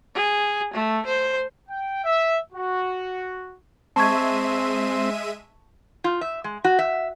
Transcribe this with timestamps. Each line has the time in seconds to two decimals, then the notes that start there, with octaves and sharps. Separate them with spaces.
0.15 G#4
0.74 A3
1.06 C5
1.69 G5
2.05 E5
2.53 F#4
3.96 G#3 C4 E5 A5 C#6 G#6 D#7
6.04 F4
6.21 E5
6.44 G#3
6.64 F#4
6.79 E5